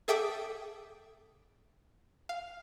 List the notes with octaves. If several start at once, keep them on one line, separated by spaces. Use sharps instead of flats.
G#4 A4 E5 G5 D6 D#6
F5